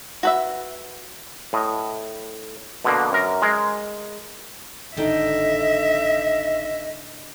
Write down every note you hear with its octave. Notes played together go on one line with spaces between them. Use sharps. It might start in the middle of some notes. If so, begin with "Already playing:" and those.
F#4 B4 E5
A2 D#5
B2 D3 A#3
F#2 A#4
G#3 A#4
G#1 A2 D3 D#4 D#5 E5 G5